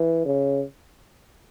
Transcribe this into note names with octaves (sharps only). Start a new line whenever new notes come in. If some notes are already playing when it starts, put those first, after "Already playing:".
Already playing: E3
C#3